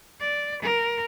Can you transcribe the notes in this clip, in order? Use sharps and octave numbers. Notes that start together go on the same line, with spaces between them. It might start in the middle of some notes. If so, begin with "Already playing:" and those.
D5
A#4